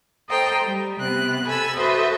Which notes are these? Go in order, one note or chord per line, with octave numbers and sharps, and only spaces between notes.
A4 C5 D#5 G5 A#5
G3
C3 B3 F#6
A4 G#5 B5 E6
F#4 A4 B4 C5 D#5 E5